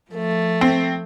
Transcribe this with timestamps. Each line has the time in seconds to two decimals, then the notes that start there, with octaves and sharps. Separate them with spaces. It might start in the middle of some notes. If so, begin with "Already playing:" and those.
0.11 F3 A3
0.61 C4